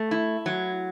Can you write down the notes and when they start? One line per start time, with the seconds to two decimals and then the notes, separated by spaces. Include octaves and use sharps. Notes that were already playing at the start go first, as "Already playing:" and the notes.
Already playing: A3
0.11 E4
0.46 F#3